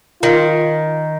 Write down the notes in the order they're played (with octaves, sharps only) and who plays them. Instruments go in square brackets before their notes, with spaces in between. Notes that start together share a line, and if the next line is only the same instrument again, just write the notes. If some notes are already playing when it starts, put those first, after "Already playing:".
[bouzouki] D#3 [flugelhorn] F4